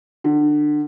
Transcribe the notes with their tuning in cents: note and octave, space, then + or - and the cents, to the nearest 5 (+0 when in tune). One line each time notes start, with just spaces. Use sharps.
D3 +25